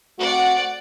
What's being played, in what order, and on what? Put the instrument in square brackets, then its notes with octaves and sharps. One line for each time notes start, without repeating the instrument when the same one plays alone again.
[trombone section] A3 C4 F#4 [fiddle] D5 F#5